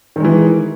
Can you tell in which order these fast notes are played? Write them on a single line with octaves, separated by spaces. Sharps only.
D#3 G#3 E3